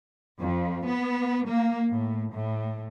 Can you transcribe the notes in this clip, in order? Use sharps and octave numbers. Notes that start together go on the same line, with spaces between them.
F2
B3
A#3
A2
A2